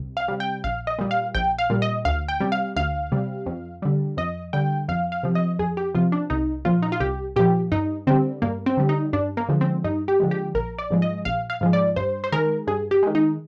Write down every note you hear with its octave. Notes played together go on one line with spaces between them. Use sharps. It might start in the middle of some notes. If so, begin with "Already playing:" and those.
Already playing: C2
F5
C3 G3
G5
A#1 F5
D#5
A#2 G3
F5
A#1 G5
F5
A#2 G3
D#5
D2 F5
G5
C3 G3
F5
D2 F5
C3 G3
F2
D3 G3
F2 D#5
D3 G3 G5
F2 F5
F5
C3 F3
D#5
F2 G#4
G4
C3 F3 F4
D4
C2 D#4
A#2 F3 F4
D#4
F4
C2 G4
A#2 F3 G4
G2 D#4
D3 G3 C4
G2 A#3
C4
D3 G3
D#4
G2 D4
A#3
D3 F3 G#3
C4
G2 D#4
G4
D3 F3 G#3
G4
A#1 A#4
D5
G#2 F3 G#3
D#5
A#1 F5
F5
G#2 F3 G#3
D5
G2 C5
C5
D#3 G#3 A#4
G2 G#4
G4
D#3 G#3
D#4